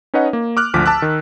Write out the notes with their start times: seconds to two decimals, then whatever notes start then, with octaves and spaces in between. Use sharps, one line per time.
0.14 C#4 D#4 B4 C#5 D#5 F#5
0.33 A#3
0.57 D6 F6 F#6
0.74 G#1 D2 F3 D6 B6
0.86 A5 D6 E6 F#6
1.02 D#3